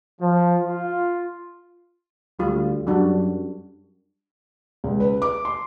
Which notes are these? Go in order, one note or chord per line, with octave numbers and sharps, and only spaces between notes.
F3
F4
D2 G3 F4
F#2 G3 D4 F#4
C#2
B4
D6
C6